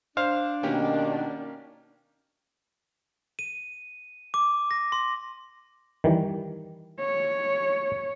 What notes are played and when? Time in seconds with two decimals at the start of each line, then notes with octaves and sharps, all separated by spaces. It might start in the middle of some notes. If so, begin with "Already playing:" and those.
0.17 D4 C5 F5
0.63 B2 D#3 A#3 C#4 G4
3.39 D#7
4.34 D6
4.71 A#6
4.92 C6
6.04 D#3 E3 G3
6.99 C#5